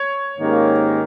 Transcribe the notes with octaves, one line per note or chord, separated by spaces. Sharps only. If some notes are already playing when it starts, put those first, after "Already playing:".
Already playing: C#5
G#2 D#3 A#3 C#4 G4